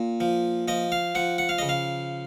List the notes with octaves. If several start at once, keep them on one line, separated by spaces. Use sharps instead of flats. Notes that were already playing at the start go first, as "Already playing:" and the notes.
Already playing: A#2
F3
F3 D#5
F5
F3 F#5
F#5
F5
C#3 D#5
F5